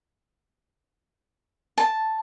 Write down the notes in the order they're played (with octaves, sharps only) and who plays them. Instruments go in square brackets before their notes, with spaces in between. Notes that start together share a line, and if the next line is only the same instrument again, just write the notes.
[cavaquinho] A5